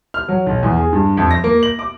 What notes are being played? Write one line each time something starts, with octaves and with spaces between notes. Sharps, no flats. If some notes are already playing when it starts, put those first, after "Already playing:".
F6
F#3
B1
E2
G#4
G2
F2
A#6
A#3
F#7
D6